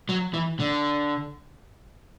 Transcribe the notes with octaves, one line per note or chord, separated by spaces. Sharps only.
F#3
E3
D3